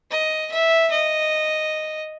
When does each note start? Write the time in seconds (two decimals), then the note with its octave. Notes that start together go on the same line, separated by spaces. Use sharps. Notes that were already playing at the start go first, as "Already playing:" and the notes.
0.11 D#5
0.52 E5
0.91 D#5